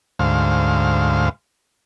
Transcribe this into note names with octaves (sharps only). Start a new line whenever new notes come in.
D2 G#2 C5 F5